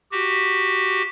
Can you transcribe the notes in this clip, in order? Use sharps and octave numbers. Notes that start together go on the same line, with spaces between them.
F#4 G4